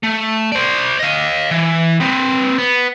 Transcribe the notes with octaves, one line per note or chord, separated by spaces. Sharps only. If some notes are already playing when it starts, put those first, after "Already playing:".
A3
C5 D5
D#5 F5
E3
C4 B4
B3